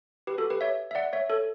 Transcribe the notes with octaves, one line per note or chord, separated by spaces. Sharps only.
G4 B4
F#4 A4
G4 B4
C#5 E5
E5
D5 F#5
C#5 E5
A4 C#5